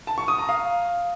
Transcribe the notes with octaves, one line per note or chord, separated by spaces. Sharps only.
A5
C#6
D#6
A#5
F5